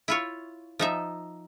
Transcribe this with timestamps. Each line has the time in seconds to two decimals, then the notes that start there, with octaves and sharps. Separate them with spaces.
0.08 E4 F4 C#5
0.79 F3 D#4 E5